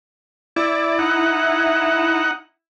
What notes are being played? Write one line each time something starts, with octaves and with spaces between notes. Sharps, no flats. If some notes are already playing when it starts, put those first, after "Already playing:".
E4 D5
D#4 F#5